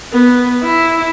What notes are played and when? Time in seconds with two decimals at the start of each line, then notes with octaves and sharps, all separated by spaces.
0.13 B3
0.62 E4